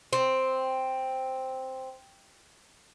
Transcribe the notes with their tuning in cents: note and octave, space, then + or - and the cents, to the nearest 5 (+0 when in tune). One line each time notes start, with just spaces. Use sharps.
C4 +0